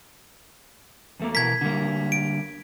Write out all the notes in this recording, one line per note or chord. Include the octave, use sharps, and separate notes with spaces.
E2 A3 A#3
B2 E3 A#4 G#6 B6
D3 G3 A#3
D7